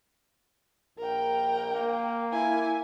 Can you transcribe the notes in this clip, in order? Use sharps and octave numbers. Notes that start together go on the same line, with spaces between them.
A#1 A#4 G5
A#3
E4 G#5